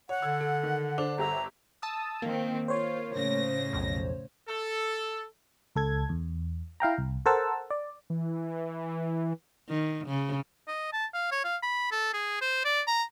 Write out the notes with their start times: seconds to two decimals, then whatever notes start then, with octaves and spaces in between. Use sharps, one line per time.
0.09 C#5 F#5
0.22 D3 E6 G#6
0.41 A4
0.63 D#3
0.98 D4 C5 D6
1.18 G1 G4 E5 A#5
1.82 A5 D#6 E6
2.22 D#3 A#3 C4
2.68 F4 C5 C#5
3.14 A2 C#3 A#6
3.73 B1 F2
4.49 A4
5.75 C#2 A4 G#6
6.09 E2
6.80 E4 F5 G5 A#5
6.98 C2
7.26 A4 A#4 C5 F#5 A5 E6
7.70 D5
8.10 E3
9.69 D#3
10.07 C#3
10.68 D#5
10.93 A5
11.14 F5
11.32 C#5
11.44 F5
11.63 B5
11.91 A4
12.14 G#4
12.41 C5
12.65 D5
12.88 A#5